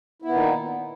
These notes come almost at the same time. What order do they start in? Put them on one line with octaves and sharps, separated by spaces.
E4 B3 A#2 D#3 D#4